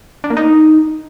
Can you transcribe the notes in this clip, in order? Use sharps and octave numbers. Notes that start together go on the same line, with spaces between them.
D4
A#3
D#4